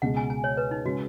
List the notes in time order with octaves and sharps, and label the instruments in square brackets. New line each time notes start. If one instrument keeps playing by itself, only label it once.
[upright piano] C#2 B2 G#3 [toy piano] F#5
[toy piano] G#5
G#5
C#5
B4
D#4
[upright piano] C#3 G#3 [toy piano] F#4